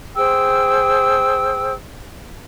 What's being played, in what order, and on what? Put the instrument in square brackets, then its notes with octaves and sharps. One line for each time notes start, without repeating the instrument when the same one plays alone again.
[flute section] G#4 C5 G5 E6